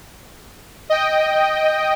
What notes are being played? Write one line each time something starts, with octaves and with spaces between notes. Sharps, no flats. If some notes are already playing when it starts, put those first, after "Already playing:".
D#5 G5